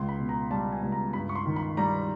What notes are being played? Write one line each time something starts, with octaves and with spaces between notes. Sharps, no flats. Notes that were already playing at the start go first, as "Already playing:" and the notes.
Already playing: C#2 C6
B5
B2
A#5
G3 A5
G#5
C#2
A#5
G2 B5
C#6
C6
D#3
B5
G3 A#5